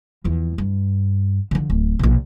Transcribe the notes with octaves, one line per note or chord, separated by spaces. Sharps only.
E2 F3
G2
D3 F3
D1
A#1 B2